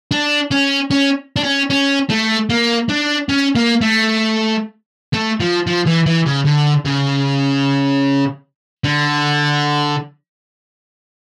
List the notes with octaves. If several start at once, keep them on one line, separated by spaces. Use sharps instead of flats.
D4
C#4
C#4
D4
C#4
C#4
A3
A#3
D4
C#4
A#3
A3
A3
F3
F3
E3
E3
C#3
D3
C#3
D3